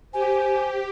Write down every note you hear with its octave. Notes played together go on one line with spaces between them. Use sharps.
G4 C5 G#5